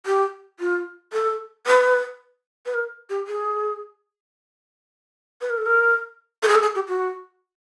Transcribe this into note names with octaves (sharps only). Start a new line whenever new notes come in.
G4
F4
A4
B4
B4
A#4
G4
G#4
B4
A#4
A4
A#4
A4
G#4
A4
G#4
G4
F#4